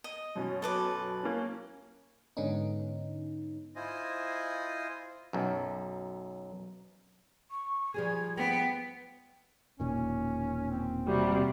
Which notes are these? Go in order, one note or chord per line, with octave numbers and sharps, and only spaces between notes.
D#5
F#2 B2 C#4
A4 B4 D6
A#3 C#4
G#2 D3 B3 C#4 D#4
E4 F4 C5 D#5 G#5
B1 F#2
C#6
F3 G3 G#4 G#6
B3 G5
E1 A#2 D#3 C#4
C4
C3 G3 F#4